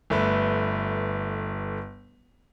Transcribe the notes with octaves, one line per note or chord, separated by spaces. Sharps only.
G1 A3 B4